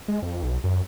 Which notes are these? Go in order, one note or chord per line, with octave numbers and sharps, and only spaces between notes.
G#3
F2
B1
F#2